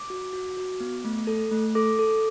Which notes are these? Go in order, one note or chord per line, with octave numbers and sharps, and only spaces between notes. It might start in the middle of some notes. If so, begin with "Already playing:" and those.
Already playing: D6
F#4
F#4
F#4
B3
A3
A4
A3
A4 D6
A4